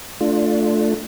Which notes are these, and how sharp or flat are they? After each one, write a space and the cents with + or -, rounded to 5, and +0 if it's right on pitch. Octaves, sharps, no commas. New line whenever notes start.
A3 +0 D4 +5 F4 +5